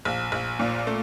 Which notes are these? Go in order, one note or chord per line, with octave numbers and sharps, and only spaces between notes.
A#1
A#1
A#2
A3